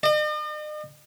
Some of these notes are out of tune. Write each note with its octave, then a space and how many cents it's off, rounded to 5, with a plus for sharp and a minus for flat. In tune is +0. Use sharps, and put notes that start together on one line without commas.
D#5 -45